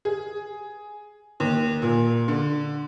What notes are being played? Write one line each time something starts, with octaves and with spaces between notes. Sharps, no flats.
G#4
D#2
A#2
D3